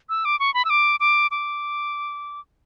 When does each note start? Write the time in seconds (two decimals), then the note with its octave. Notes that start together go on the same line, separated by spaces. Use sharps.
0.09 E6
0.25 D6
0.40 C#6
0.54 B5
0.65 E6
0.70 D6
1.00 D6
1.31 D6